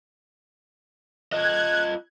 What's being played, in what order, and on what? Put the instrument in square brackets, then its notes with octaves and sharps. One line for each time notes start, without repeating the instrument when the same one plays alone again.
[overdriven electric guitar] F4 D#5 [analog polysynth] F#6 G#6